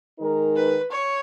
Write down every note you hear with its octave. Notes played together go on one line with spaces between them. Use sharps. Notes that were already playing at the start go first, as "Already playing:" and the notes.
D#3 G#3 D#4 A#4
B4
C#5